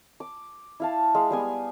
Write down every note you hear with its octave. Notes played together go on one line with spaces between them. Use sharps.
D6
E4 F5 A5
G#3 F5
G3 B3 G#5